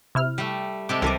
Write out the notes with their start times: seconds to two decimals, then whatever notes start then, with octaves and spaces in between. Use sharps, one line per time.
0.15 C3 E4 F6
0.38 G3 A3
0.89 C3 G#3 A4 D6
1.02 C2 E3 A#4 G#5 A5 D6